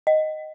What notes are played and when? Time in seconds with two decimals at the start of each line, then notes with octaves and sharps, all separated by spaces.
0.07 D#5